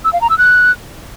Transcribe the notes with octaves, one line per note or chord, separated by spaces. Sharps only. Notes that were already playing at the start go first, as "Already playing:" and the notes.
E6
F5
A#5
E6
F#6